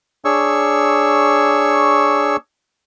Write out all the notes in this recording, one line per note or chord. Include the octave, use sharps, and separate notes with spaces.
D4 G#4 C#5 C#6 E6